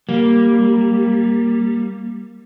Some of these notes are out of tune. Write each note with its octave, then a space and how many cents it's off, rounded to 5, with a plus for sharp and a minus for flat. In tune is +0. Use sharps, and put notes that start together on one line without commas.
G3 +0 A#3 +0